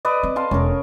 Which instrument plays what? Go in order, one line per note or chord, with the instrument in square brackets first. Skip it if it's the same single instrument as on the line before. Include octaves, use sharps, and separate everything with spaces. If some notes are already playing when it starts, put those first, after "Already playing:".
[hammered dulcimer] B4 D5 D#5
[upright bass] C4
[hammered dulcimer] F5 A5 C6
[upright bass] E1 [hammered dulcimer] C#4 A#4